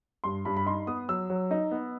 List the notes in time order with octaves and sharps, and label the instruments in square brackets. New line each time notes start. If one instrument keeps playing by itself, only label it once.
[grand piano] G2 C6
G2 B5
B5
D#4 C6
B3 D#6
F#3 E6
F#3
D#4
B3